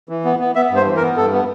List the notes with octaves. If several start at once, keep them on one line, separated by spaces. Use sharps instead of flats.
E3
B3
B3
B3 E5
G2
C5
E3
A#4
B3
G2 A4
B3